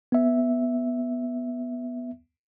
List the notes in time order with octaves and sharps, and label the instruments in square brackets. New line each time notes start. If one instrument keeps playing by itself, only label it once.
[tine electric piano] B3 E5